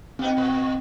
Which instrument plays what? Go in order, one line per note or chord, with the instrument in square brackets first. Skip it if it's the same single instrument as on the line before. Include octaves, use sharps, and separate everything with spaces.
[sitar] B2 B3 D#4 [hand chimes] C4
[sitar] A#2 B4